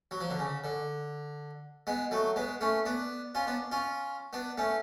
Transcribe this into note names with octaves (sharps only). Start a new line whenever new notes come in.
F#3
F3
D3
C#3
D3
G#3 B3
F#3 A3
G#3 B3
A3 C#4
B3 D4
C#4 F4
B3 D4
C#4 F4
B3 D4
A3 C#4